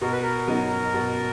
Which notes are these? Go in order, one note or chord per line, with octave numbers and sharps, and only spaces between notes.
B2 A#4
B4
A#4
F#3 B3 D#4
B2